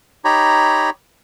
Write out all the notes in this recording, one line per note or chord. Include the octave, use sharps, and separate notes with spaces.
D#4 G4 C#5 A#5 B5